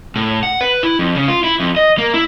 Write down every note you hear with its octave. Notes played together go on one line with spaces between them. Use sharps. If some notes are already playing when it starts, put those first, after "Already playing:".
A2
F#5
B4
E4
F2
C#3
F4
E4
F2
D#5
A#3
E4